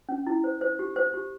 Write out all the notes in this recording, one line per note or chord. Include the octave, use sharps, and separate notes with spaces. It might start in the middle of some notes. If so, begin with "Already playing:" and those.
C#4
E4
C5
C5
G4
C5
G4